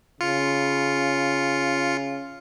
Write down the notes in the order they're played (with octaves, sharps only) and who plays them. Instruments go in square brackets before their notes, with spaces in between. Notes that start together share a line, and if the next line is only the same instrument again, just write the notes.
[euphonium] C#3 [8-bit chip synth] F4 C#7